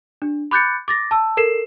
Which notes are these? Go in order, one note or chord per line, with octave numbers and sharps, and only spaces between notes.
D4
B5 D6 F#6 G6 A6 C#7
D6 A6 A#6
A5 E6
A4 A#4 C7 E7